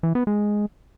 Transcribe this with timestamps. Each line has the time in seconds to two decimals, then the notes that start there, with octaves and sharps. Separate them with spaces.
0.03 E3
0.15 B3
0.27 G#3